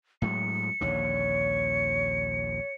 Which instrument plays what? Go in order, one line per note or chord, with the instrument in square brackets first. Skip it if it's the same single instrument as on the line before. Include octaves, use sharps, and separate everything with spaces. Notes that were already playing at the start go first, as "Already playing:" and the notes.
[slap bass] A2 F#3 G#3 [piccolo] C#7
[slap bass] A#1 D#2 D3 [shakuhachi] C#5